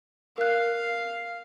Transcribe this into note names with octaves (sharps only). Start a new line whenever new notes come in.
A#4 F5 F#6